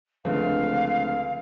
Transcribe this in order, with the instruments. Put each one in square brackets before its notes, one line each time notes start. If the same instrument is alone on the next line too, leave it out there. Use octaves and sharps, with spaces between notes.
[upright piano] C#2 D3 [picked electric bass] F3 A3 C4 [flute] F5